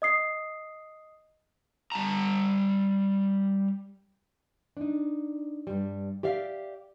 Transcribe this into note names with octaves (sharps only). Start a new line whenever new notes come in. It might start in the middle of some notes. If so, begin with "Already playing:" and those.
D#5 D#6 C7
G3 A5 A#5
D4 D#4
G2 G3
G4 D5 E5 F5